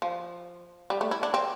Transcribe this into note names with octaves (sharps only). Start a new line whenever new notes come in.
F3
G3
A3
E4
D4
C4